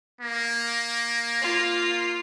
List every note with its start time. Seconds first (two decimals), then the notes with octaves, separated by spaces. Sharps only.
0.21 A#3
1.42 F4